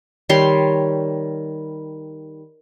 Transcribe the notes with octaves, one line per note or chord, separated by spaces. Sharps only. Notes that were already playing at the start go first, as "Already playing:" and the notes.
D#3 G3 C#5 C6